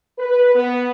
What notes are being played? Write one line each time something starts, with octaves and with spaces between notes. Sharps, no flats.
B4
B3